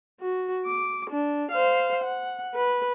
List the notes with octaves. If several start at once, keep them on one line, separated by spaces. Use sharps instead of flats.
F#4
D6
D4
C5 F5
F#5
B4